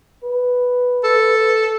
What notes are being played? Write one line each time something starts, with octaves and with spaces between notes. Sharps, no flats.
B4
A4